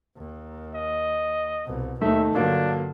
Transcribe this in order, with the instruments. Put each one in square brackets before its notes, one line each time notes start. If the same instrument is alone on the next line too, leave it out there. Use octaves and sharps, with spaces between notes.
[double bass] D#2
[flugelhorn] D#5
[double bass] C2 B2
[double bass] D#2 [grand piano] A3 D#4 [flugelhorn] E5
[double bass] G2 D3 [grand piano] F#3 A#3 F4 [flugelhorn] D4